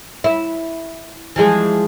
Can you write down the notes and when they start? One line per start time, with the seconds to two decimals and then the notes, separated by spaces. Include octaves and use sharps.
0.24 E4
1.36 E3 F3 G#3